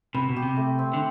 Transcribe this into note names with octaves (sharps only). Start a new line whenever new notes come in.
C3 B4
B2
G4
C3
A3
C4
D3